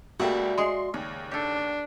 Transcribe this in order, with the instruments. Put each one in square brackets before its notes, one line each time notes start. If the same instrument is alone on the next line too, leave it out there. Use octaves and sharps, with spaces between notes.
[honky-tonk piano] C#2 A#3 G4 [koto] A3 [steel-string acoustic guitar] F#4 D5 E5
[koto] G#3 G#4 [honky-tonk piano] C6 C7
[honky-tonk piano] D#2 [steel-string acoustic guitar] C#3
[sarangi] D4 [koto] G4 A4